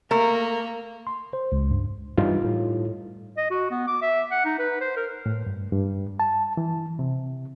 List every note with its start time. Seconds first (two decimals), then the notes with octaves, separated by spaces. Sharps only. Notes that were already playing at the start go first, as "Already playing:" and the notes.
0.11 A3 A#3 A#4
1.07 C6
1.33 C5
1.52 C#2
1.71 G2
2.18 G2 E3 G3 D#4 F4
2.44 A2
3.37 D#5
3.50 F#4
3.71 B3
3.87 D6
4.02 E5
4.31 F#5
4.45 D#4
4.59 B4
4.81 C5
4.96 A#4
5.26 A2
5.47 G2
5.72 G2
6.20 A5
6.57 E3
6.99 C3